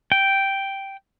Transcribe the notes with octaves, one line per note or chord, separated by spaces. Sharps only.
G5